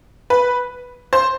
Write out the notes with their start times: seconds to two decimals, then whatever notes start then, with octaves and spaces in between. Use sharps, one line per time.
0.30 B4
1.13 C5